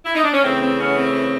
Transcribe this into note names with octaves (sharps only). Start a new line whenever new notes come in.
E4
D#4
D4
C#4
C#3 E3 A3 C4
C4
B3 C#4
C4